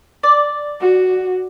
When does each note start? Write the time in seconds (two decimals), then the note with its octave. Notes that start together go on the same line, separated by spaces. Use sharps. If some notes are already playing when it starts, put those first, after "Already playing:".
0.23 D5
0.80 F#4